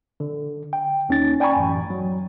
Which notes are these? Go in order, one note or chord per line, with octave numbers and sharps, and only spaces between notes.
D3
G5
D#2 C#4 D#4 A6
D5 G5 G#5 A#5 B5 C#6
A1 F#2
F#3